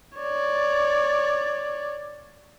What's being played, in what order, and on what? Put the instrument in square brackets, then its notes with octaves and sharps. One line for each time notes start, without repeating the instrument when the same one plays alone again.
[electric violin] C#5 D5